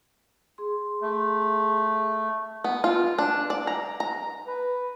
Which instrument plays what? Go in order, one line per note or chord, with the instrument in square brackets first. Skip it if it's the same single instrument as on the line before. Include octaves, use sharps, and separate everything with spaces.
[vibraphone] G#4 C6
[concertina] A3
[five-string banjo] B3
F4
D4
D5
A#5
A#5
[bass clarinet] B4